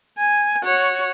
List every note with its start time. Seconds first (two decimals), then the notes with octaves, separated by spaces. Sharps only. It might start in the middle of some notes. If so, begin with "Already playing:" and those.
0.18 G#5
0.64 F#4 C#5